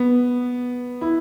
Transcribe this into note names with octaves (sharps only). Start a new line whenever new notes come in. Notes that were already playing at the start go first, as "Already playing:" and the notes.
Already playing: B3
E4